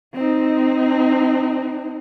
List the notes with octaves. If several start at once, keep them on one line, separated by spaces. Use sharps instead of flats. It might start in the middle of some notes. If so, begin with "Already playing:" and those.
C4 D#4